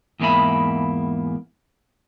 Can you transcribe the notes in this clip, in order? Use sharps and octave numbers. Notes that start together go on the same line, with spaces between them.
E2 G#2 A#3 B3 E5 B5